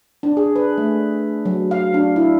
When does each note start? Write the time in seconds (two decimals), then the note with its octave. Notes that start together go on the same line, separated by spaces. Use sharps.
0.23 D4
0.37 G#4
0.56 B4
0.78 A3
1.45 F#3
1.71 F5
1.94 D4
2.16 E4